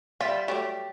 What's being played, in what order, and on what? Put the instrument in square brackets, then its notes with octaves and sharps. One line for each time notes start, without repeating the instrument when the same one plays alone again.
[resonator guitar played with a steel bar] G3 [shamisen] F4 [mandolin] E5 B5
[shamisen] F#3 A3 D5 [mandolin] G4